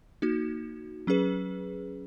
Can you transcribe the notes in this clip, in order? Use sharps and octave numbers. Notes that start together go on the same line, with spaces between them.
A#3 D#4 F#4
F#3 C#4 G#4 B4